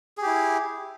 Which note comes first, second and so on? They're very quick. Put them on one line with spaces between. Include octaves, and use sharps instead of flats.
G#4 G4 E4